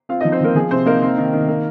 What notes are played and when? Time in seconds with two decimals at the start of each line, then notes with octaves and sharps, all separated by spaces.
0.09 C4 F4 F5
0.21 D#4 D#5
0.25 F3
0.32 C4 C5
0.41 F3 A#3 A#4
0.55 F3 G#4
0.71 C3 C4 C5
0.86 A#3 D#4 A#4
1.02 C4
1.18 D#3
1.33 D#3
1.48 A#3